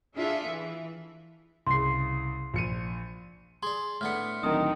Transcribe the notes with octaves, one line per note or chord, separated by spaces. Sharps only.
D4 E4 F4 G#4 A4 E5
E3
C2 C#3 C6 C7
A#1 C#7 D#7
G#4 D5 C6
A2 B3 D4 F6 C#7
D1 D#3 D#6